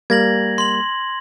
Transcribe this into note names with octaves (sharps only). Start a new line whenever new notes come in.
G3 A#3 G#6 A#6 F#7
C6 F#7